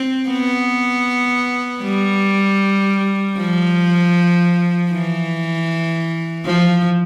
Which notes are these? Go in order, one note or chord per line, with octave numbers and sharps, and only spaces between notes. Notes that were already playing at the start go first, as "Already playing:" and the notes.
Already playing: C4
B3
G3
F3
E3
F3